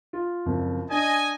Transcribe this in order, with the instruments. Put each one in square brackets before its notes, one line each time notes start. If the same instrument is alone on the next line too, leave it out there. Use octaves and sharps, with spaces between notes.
[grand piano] F4
F#1 F2
[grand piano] D4 [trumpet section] D#5 G#5